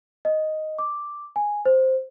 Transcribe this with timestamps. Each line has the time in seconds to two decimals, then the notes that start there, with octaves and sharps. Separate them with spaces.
0.25 D#5
0.79 D6
1.36 G#5
1.65 C5